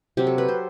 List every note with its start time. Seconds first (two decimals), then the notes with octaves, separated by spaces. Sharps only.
0.17 C3 F#3 C4 G4
0.27 A4
0.38 B4
0.48 C5